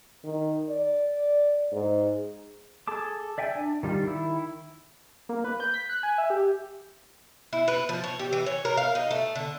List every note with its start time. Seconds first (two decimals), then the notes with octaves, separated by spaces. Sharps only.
0.24 D#3
0.70 D5
1.72 G#2
2.88 G#4 A4 A5 D6
3.38 D5 E5 G5 G#5
3.55 D4
3.83 D#3 G3 F4
4.03 D#3 E4
5.29 A#3
5.44 B4
5.60 G6
5.74 B6
5.89 F#6
6.03 G#5
6.18 E5
6.30 G4
7.53 E4
7.68 B4
7.89 F3
8.04 C#5
8.20 G4
8.33 E3
8.46 C#5
8.65 A#4
8.77 F5
8.95 D#4
9.11 A3
9.36 D3